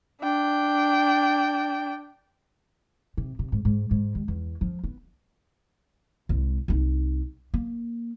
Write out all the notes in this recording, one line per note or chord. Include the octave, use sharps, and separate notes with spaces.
D4 G5
C3
C3
G#2
G#2
G#2
D#2
E2
F3
B3
C2 G#3
C2 D#4
A#3